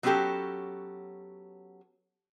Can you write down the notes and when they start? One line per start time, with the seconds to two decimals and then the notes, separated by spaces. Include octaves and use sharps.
0.03 F#3 B3 C#4 F#4 G4 A4